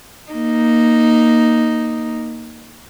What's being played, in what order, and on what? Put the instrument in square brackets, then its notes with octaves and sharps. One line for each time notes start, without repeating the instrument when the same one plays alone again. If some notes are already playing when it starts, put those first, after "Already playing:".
[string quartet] A#3 D#4